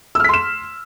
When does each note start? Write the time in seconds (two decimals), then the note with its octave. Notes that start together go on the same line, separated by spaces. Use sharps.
0.15 E6
0.20 F6
0.24 B6
0.29 C6
0.34 E7